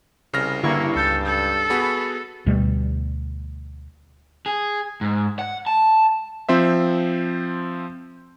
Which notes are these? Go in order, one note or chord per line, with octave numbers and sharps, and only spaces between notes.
C2 C#3 F6 A#6
G2 D3 A#3 E4 C#6
C#2 A4 G6 A6
A4
B3 F#4 G#4 B5
D2 B2 G3
G#4
G#2
F#5
A5
F3 C4 C5 E5